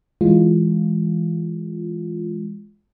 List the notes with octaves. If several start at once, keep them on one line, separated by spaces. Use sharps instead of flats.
E3 G#3 F4